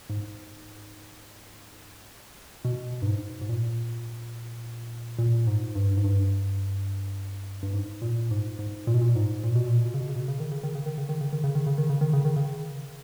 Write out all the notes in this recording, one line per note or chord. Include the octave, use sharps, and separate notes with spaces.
G#2
B2
G2
G#2
G#2
A#2
A#2
G#2
G2
G#2
G2
G2
G#2
A#2
G#2
G#2
A#2
B2
A#2
G#2
A#2
B2
A#2
B2
C#3
B2
C#3
B2
C#3
D#3
C#3
D#3
C#3
D#3
C#3
D#3
C#3
D#3
C#3
D#3
C#3
D#3
C#3
D#3
C#3
D#3
C#3